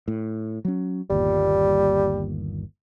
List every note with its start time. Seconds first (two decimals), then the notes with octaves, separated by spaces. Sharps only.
0.08 A2
0.65 F#3 C#4
1.10 G1 D#2 A#2 G3